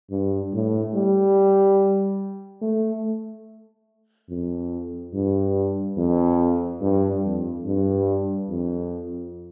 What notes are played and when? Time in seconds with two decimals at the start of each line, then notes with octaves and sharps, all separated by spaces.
0.10 G2
0.53 A2
0.95 G3
2.62 A3
4.29 F2
5.14 G2
5.97 F2
6.81 G2
7.24 F2
7.65 G2
8.49 F2